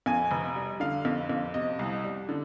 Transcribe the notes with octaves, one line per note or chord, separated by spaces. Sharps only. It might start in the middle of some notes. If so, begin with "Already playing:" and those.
F2 G#5
F1
G3
D3 F5
F2
F2
C3 D#5
C2
G3
D3